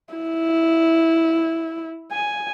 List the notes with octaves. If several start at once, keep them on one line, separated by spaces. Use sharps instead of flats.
E4
G#5